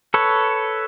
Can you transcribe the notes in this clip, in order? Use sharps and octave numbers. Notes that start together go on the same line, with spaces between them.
A4 B4 C#5